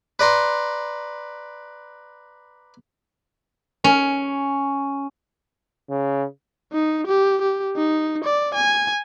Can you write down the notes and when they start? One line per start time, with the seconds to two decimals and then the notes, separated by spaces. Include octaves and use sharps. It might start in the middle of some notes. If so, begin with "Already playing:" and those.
0.19 B4 D5 A#5 C6
3.84 C#4
5.90 C#3
6.73 D#4
7.07 G4
7.41 G4
7.76 D#4
8.24 D5
8.55 G#5